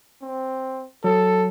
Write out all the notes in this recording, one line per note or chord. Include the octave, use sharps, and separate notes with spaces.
C4
F#3 A4